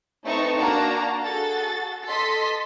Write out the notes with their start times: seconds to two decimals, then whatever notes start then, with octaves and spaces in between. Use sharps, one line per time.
0.25 A3 C4 D#4 B4 A5 C#6
0.58 A#3 D4 F#4 A5 A#5
1.23 F#4 G#4 A4 A6
2.08 A4 D#5 C6 B6